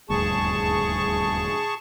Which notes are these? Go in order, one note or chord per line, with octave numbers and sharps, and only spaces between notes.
D#1 D2 G2 G#4 A5 C#6